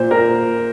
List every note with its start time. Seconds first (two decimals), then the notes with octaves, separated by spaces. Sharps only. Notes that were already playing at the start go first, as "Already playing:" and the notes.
Already playing: A#2 C5
0.11 A#2 A#4